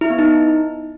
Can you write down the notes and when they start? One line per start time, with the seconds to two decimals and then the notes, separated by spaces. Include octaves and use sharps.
0.01 E4
0.10 B3
0.19 D#4